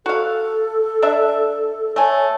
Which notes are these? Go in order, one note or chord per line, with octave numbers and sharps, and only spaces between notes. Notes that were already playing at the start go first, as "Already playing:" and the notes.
F#4 A4 F5
D4 E5
A3 C#5 G#5